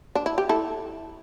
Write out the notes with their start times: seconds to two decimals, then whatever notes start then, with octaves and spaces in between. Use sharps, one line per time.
0.15 D4
0.26 E4
0.38 G4
0.49 E4 A4